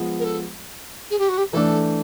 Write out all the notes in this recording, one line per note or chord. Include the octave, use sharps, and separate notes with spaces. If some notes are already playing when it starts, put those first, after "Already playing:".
Already playing: F3 G#3 B3
A#4
A4
G#4
G4
F#4
G4
E3 A3 D4 A4